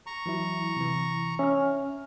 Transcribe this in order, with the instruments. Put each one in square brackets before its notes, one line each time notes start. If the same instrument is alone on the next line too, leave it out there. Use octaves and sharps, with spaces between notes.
[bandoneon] A#5 C#6
[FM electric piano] E3 F#3 E4
C3 E3
[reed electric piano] C#4 [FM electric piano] E5 F6